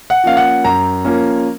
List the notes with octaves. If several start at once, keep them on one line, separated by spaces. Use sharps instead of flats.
F#5
F3 A#3 C#4 F5
F#5
F#2 A#5
F3 A#3 C#4